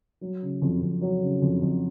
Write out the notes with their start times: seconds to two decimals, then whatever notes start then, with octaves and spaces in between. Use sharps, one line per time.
0.21 F#3
0.42 C#3
0.62 F2
0.82 F2
1.01 F#3
1.22 C#3
1.42 F2
1.62 F2